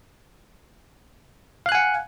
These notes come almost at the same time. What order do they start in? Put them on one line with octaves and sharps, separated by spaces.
F5 F#6 G#5 F#5